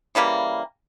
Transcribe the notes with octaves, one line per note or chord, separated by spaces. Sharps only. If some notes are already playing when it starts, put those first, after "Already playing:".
C#3 E3 G3 A#3